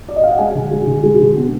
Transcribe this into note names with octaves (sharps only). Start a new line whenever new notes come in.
D5
D#5
F5
F#5
G#3 G#5
D3
G#3
D3
G#3
D3
B3